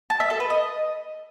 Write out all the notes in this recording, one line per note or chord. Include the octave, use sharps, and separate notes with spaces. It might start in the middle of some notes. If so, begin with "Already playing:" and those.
A5
E5
A4
B4
D#5